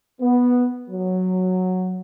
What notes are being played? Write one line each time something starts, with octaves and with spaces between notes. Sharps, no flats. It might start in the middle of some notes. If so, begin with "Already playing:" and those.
B3
F#3